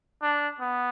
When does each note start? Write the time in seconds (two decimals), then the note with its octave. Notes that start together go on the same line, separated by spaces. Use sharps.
0.23 D4
0.60 B3